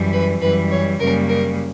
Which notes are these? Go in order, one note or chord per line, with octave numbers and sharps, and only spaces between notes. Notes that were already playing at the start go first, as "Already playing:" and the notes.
Already playing: F#2 E3 G3
B4
F#2 E3 G3 B4
C#5
F#2 C#3 G3 A#3 A#4
A#4